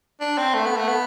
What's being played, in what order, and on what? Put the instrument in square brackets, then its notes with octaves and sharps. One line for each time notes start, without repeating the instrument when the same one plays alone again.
[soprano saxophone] D4
C4
A3
B3
A3
B3